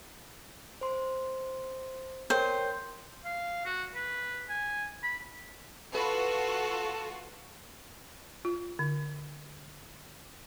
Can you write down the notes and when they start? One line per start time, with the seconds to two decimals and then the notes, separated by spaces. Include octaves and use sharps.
0.81 C5 C6
2.30 A#4 C5 C#5 G5
3.25 F5
3.65 F#4
3.95 B4
4.49 G#5
5.03 B5
5.95 F4 F#4 A4 B4 A5
8.45 F4
8.79 D3